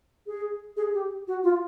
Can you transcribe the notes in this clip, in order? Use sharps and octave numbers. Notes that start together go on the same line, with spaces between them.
G#4
G#4
G4
F#4
F4